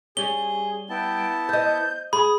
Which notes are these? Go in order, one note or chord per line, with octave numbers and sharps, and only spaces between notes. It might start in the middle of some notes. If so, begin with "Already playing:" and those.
G3 C#4 G#4 G7
B3 E4 G5 A5
C5 D#5 G6
G#4 B5 D#6